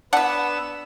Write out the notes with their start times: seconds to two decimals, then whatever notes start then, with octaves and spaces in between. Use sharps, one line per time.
0.13 B3 D4 B4 F#5 E6